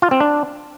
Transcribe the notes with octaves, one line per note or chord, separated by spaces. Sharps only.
F4
C4
D4